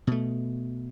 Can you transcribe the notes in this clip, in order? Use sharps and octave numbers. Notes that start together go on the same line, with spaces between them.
B2 A3